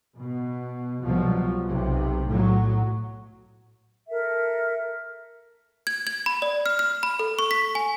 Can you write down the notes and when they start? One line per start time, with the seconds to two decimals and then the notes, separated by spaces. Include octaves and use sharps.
0.18 B2
1.02 C2 B2 F3 F#3
1.69 B1 C3
2.29 A2 F#3
4.08 A4 A#4 E5
5.87 G#6
6.07 G#6
6.26 B5
6.42 D5
6.66 F6
6.79 F6
7.03 B5
7.19 A4
7.39 C#6
7.51 B6
7.75 G#5